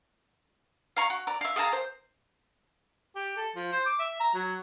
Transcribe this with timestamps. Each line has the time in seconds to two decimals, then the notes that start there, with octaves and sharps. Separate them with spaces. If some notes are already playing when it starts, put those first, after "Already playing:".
0.96 F5 A#5 C#6
1.10 F#4
1.27 D5 A#5
1.41 E5 F5
1.56 G#4 F5 A5 A#5
1.73 C5
3.15 G4
3.37 A4
3.56 F3
3.72 C5
3.86 D6
3.99 E5
4.20 A#5
4.34 F#3